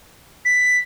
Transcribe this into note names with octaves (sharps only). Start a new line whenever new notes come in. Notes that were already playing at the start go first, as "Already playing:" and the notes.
B6